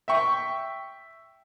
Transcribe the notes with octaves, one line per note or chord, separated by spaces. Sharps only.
E5 G5 C#6